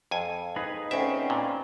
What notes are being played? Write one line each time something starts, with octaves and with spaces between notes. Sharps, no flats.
F2 G#5
D#4 G#4 B4
D2 C4 C#4 E5
A#2